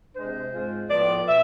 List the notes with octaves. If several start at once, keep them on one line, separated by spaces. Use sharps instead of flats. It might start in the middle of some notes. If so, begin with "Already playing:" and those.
C3 G#3 D4 C5
G#2 G#3 C4 F4
A2 F3 B3 D5
B2 E5